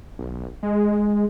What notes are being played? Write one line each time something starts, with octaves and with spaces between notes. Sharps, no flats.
B1
G#3